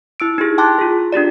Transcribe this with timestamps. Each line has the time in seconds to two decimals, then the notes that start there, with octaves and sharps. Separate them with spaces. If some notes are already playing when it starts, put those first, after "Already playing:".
0.20 E4 E6 D7
0.38 D#4 E4 G4 G#4
0.58 G5 A5 C6 D6 F#6 A6
0.79 F4 G#4
1.13 D4 F4 G4 D5